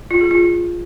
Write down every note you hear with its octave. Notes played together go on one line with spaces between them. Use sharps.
F4
G#4
F4